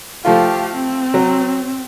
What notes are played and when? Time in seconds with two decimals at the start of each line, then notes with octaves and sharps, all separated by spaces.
0.25 F3 A3 F4 G4 F5
0.74 C4
1.14 F#3